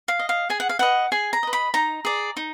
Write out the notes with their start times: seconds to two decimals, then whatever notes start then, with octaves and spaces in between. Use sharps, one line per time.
0.08 F5
0.19 D#5
0.29 F5
0.50 G#4 G#5
0.60 F#5
0.69 F5
0.79 B4 D#5 F#5
1.12 G#4 G#5
1.33 A#5
1.43 B4 D#5
1.53 B5
1.74 D#4 A#5
2.05 G#4 D5
2.37 D#4